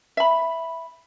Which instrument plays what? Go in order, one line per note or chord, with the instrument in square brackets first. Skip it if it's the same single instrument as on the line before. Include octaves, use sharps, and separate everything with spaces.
[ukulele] E5 B5